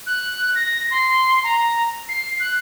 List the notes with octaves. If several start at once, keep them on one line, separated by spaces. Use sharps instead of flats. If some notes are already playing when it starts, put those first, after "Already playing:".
F#6
A#6
C6
A#5
C7
F#6